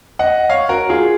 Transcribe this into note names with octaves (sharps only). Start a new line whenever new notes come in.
D#5 F#5
C#5 F5
F#4 A#4
F4 G#4